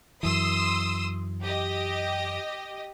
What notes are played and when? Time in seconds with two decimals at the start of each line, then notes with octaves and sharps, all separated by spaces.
0.23 F#2 E3 C6 D#6 E6
1.42 G4 D#5